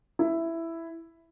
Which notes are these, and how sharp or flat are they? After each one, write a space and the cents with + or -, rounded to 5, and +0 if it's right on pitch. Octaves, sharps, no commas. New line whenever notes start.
E4 +5